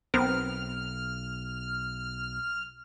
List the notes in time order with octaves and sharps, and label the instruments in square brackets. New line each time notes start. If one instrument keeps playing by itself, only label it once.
[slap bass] B1 [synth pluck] B3 C4 A#4 [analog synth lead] F6